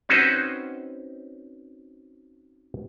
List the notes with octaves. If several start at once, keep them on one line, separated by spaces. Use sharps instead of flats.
C4 C#4 D#4 F#4 B4 C5